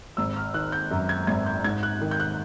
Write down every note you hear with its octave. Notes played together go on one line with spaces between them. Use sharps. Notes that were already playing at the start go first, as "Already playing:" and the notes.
G#1 E6
F6
D#3 F#6
G6
F#2
G#6
G#1 G#6
G6
G#2 G#6
F#6
D#3
G6
F#6